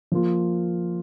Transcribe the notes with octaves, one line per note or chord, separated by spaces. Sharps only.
F3 A#3 F4